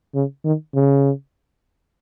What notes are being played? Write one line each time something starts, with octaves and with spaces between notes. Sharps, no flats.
C#3
D#3
C#3